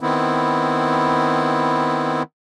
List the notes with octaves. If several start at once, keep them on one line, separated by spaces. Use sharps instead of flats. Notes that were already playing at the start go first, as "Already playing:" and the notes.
D#3 B3 C4 E4